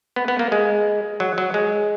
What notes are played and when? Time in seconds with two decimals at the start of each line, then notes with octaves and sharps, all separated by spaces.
0.16 B3
0.28 B3
0.39 A#3
0.52 G#3
1.20 F#3
1.38 F#3
1.54 G#3